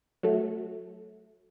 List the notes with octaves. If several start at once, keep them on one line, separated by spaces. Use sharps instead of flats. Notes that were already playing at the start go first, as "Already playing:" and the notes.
F#3 A3